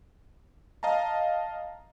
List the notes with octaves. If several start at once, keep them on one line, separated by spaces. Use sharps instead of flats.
D#5 F5 A5 A#5